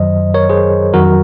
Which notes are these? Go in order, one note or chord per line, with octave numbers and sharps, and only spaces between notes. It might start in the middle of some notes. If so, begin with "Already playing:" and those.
Already playing: F#2 D#3 F#3 C5 D#5
A#4 C#5
G#4 C5
F2 D#3 F#3 F#4 A#4